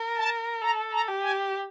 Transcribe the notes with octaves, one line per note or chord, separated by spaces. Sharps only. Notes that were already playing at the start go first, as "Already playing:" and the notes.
Already playing: A#4
A5
A4 A#5
A#5
G4
G#5